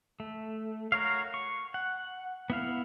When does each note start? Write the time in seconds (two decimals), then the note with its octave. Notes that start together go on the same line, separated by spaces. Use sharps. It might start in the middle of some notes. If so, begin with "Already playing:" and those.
0.20 A3
0.92 F#4 A#4 C#5 F5
1.34 C#6
1.74 F#5
2.50 B3 E4 F5